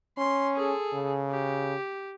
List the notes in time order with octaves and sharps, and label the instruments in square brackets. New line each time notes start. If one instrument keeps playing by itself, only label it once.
[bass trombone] C#4 [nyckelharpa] C6
[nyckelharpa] G#4 A4
[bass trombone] C#3
[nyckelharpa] G4